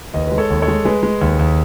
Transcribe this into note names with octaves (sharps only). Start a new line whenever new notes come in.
D#2 B4 D#5
G#3 B4
A4 C#5
D#2
A4 C#5
G#3
G#3 G#4 B4
G#3
D#2
D#2